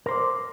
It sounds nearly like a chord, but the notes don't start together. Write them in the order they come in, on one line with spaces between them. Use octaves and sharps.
A#4 C5 D5